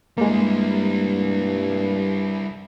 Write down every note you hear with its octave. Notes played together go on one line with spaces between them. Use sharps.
G2 G3 G#3 A#3 E4